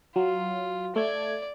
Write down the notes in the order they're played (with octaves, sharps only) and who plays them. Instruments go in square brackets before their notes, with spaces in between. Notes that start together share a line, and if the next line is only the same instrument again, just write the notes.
[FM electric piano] F#3 [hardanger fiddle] F4
[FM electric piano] A3 G#6 [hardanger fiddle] D5